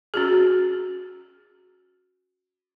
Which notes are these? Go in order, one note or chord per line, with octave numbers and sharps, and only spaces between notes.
C#4 F#4 G#4